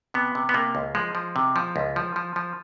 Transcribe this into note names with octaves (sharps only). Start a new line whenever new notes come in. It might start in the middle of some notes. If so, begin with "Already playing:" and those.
C3 B3
C3
B3
C3 A#3
C#2
F3 G#3
F3
C3
F3
C#2
F3
F3
F3